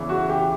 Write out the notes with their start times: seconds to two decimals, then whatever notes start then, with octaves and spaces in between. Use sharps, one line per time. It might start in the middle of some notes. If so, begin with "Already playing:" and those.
Already playing: E2 C#3 E3
0.09 F#4
0.29 G4